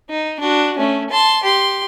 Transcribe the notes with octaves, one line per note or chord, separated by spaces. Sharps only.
D#4
D4 F#4
A3 C#4
A5 C6
G4 C6